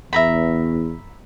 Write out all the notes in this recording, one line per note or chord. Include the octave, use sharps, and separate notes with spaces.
E2 E5 A#5 B5